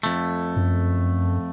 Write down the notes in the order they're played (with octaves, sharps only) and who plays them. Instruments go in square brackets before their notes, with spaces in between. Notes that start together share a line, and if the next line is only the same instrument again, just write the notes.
[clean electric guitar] F2 A3
[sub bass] F#2